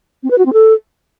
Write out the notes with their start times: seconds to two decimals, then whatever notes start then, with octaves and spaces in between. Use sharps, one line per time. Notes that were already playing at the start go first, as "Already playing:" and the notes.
0.23 C4
0.31 B4
0.38 F#4
0.46 C4
0.53 A4